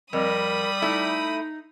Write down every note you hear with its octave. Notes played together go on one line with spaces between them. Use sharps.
F2 G3 A#4 B5 D#6
A3 D#4 E4